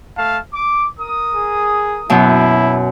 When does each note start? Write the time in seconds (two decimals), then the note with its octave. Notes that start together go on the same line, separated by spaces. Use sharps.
0.17 A3 F5 A5
0.53 D6
0.99 A#4 D#6
1.34 G#4
2.10 F#2 B2 E4